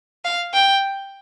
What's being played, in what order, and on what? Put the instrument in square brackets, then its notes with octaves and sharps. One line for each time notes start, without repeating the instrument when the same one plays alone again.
[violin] F5
G5